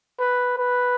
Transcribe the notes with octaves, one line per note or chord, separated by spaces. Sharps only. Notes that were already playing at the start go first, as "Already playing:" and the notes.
B4
B4